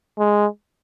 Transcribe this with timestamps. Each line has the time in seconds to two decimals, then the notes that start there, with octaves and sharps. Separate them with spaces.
0.19 G#3